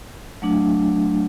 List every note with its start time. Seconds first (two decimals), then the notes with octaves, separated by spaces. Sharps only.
0.42 F#3 A3 D4